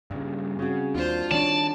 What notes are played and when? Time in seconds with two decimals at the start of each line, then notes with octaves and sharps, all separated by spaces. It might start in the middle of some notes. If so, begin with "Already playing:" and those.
0.11 G2 C#3 G3
0.59 C#3 C4 F#4
0.95 D#2 D4 F4 C5
1.31 D#3 A3 D4 C#5 D5 A5